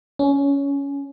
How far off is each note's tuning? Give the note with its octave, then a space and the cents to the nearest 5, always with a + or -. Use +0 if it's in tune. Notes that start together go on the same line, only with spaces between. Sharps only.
C#4 +15